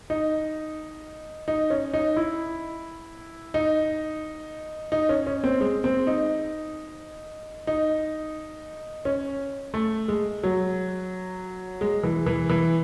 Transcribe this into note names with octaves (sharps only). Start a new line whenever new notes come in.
D#4
D#4
C#4
D#4
E4
D#4
D#4
C#4
C#4
C4
G#3
C4
D#4
D#4
C#4
A3
G#3
F#3
G#3
E3
E3
E3